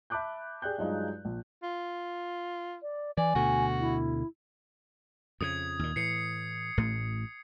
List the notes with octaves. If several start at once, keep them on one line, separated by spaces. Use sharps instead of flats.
E5 A5 B5 D6 F#6 G6
G4 G#4 D5 G5 F#6 G6
G2 F#3 G#3 D#4 F4
A#1
F4
D5
E3 D5 G#5
D2 B2 A3 F#4
E4
F2 C#3 D#6 G#6
D#2 A#2
A2 E3 C7 C#7
A1 A2 A3